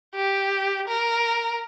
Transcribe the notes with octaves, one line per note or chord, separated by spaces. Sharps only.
G4
A#4